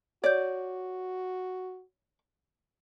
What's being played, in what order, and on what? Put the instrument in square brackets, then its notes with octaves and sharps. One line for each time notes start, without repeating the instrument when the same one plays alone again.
[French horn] F#4 [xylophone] C#5 G6 [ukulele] D5